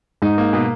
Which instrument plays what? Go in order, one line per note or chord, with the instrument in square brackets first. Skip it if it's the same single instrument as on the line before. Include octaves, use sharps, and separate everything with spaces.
[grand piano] G#2 [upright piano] D#4
[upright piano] A#3
B2